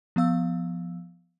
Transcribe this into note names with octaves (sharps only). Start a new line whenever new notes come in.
F3 B3 F5 E6